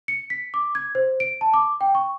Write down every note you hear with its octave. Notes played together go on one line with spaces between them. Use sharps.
C#7
B6
D6
G#6
C5
D7
A5
D6
G5
C#6